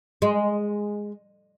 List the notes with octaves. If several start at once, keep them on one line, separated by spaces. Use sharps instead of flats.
G#3